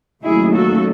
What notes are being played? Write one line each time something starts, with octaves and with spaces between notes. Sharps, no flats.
D#2 C#3 F#3 A3 E4 G#4
F#4 A4